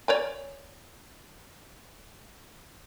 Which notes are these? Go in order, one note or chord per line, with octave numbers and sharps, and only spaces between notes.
C#5 D5 G#5